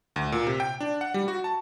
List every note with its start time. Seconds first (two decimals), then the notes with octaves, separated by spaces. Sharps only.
0.16 D2
0.32 A#2
0.47 C3
0.60 G5
0.80 D4
1.01 F#5
1.14 G3
1.28 F#4
1.44 A5